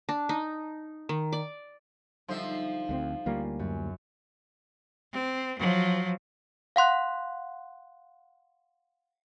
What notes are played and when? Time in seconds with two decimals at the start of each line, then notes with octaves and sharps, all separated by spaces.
0.09 D4
0.29 D#4
1.09 D#3
1.33 D5
2.28 D3 F3 G3 D#4 C5 E5
2.89 D2 A3 C4
3.26 D2 G3 A#3 C#4 F4
3.59 F#2
5.13 C4
5.58 F3 F#3
6.76 F5 F#5 C6 F#6